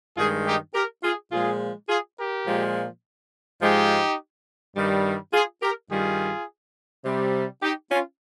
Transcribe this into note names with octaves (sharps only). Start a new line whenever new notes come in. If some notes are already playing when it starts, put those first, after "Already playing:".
G2 D#3 G#3 F4 G#4
D#4 G4
G4 A#4
F4 G#4
A#2 F3 G#3 F4 G#4
F4 G#4
G4 A#4
A#2 F3 G#3
G#2 F3 G#3 D#4 G4
G2 D#3 G3
F4 G#4
G4 A#4
G2 D#3 G3 F4 G#4
C3 G3
D#4 G4
C#4 F4